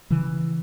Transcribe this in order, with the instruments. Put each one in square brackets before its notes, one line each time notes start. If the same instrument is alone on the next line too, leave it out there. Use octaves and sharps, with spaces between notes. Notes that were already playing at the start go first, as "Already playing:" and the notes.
[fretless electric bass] C#3 E3